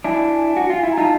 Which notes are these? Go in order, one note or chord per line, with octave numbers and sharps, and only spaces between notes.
D4 E4 G#5
F#4
F4
E4
A#5
D#4 F4 A5